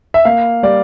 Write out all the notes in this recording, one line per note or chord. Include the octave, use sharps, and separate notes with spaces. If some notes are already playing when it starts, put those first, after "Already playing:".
E5
A#3 F5
G3 D5